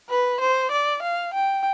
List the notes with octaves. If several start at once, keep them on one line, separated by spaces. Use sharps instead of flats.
B4
C5
D5
F5
G5